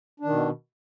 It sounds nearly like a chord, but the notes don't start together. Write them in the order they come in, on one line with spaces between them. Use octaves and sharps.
D4 D#3 B2